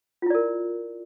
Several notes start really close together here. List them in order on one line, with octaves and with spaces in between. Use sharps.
F4 E4 D5 A#4